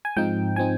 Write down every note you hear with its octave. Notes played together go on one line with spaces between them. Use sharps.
G#5
G#2 F3 C4 D#4 G5
F3 C4 D#4 G#5